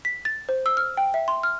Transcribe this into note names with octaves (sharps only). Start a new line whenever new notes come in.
B6
A6
C5
E6
F6
G5
E5
C6
F6